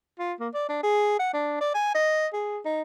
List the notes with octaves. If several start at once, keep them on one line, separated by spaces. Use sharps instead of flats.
F4
A#3
D5
D4
G#4
F#5
D4
D5
G#5
D#5
G#4
D#4